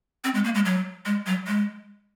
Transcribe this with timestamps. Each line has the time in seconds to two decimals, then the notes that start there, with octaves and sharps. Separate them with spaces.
0.24 C4
0.34 G#3
0.44 A#3
0.55 G#3
0.65 F#3
1.06 G#3
1.27 F#3
1.47 G#3